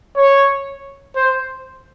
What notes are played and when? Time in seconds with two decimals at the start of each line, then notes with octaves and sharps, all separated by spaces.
0.17 C#5
1.16 C5